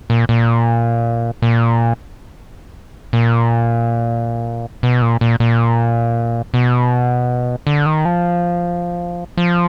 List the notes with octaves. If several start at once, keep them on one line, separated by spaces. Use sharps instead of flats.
A#2
A#2
A#2
A#2
B2
A#2
A#2
A#2
B2
D3
D#3
F3
F3